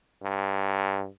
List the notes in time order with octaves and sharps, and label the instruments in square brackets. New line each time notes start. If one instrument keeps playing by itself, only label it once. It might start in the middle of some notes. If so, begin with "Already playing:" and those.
[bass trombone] G2